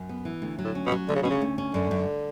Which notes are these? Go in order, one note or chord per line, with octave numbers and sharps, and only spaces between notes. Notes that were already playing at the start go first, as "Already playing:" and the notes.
Already playing: F#2
B3
E3
D2
F#3
A2
C#4
B2
F#3
D2 D3
C#3
B2 C#4
C#3
D2
C#4
F#2 D3
F#2